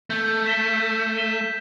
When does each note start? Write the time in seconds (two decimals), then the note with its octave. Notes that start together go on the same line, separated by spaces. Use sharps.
0.10 A3 G6
0.46 B6 E7 G7
0.82 G6
1.18 B6 E7 G7